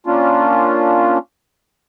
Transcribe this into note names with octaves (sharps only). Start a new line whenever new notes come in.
A#3 C#4 D4 F4